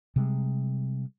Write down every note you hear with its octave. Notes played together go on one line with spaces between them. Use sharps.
C3 G3 G#3